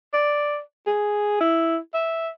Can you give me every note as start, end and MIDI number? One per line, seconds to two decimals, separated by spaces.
0.13 0.59 74
0.86 1.40 68
1.40 1.78 64
1.94 2.29 76